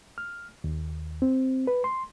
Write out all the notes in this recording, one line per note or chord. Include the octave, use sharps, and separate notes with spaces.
F6
D#2
C4
B4
C6